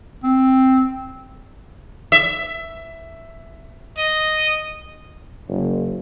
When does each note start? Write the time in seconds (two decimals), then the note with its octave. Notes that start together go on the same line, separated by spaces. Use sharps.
0.23 C4
2.12 E5
3.98 D#5
5.49 F#1